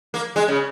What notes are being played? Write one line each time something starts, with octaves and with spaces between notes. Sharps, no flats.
A#3
G#3
C#3